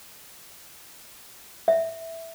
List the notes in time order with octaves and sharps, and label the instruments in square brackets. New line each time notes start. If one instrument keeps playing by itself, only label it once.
[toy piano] E5